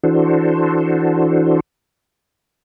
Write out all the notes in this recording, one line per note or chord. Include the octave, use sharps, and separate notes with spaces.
E3 D4 F#4 A4 C5